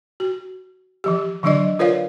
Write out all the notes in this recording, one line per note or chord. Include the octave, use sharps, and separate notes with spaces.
F#4
E3 F3 G4
D3 E3 F#3 D4 D5 D#5
F4 A#4 B4 C#5 D5 F5